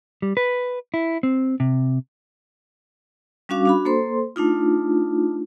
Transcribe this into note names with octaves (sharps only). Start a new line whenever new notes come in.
G3
B4
E4
C4
C3
G3 C#4 D4 F#4 F5 D6
D4 F#4 B5
A#3 A4 C5 C6
A3 D4 D#4 F4